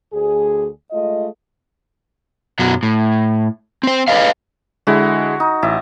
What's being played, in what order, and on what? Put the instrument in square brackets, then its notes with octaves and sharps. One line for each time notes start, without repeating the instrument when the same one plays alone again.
[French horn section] D2 G#4
G#3 A3 F4 D#5
[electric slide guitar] F#2 B2 F#3
A2
C4 C5
A4 B4 C#5 D#5 F5
[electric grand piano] D3 G#3 E4 [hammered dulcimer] F#4
[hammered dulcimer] D#4
[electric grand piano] A1 [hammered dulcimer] E4